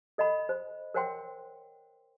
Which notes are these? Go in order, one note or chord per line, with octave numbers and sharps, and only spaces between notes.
A4 D#5 F#5 B5
C5
A#4 C5 C#5 F#5 G5 C6